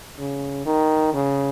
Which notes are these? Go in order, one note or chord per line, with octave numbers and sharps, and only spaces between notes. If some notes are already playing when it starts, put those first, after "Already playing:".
C#3
D#3
C#3